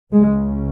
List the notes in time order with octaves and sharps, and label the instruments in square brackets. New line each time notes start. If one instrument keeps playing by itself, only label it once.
[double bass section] C#2 C#3 G#3